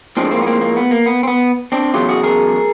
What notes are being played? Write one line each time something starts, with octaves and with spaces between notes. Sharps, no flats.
A2 F3 G#3 C4 D4
A#3 C4
B3
A#3 C4
A#3
B3
A#3
B3
C4
B3
C4 D4
E2 C#3 F#3 A3 F4 G4
F#4 G#4
G#4 A#4